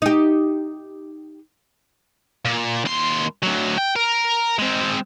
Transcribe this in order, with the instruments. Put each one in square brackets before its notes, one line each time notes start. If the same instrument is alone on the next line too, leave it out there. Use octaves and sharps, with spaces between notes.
[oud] D#4 G4
[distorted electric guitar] A#2
D#2 C6
D2 F#3
G5
A#4
G#3 C4